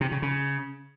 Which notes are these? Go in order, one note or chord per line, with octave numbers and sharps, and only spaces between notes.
C3
C#3
C#3